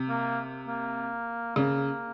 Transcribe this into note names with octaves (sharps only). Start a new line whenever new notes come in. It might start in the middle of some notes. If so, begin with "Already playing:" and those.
Already playing: C3
A#3
A#3
C#3 A#3